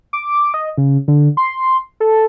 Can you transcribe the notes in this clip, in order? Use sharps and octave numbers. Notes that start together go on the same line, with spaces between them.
D6
D#5
C#3
D3
C6
A4